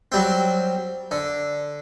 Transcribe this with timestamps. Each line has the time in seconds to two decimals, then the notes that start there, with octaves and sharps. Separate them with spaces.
0.12 F#3 G3 C4
1.11 D3